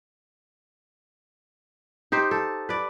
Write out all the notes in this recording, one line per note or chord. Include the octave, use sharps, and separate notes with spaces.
D#4 G4 C5
A4
B4 D5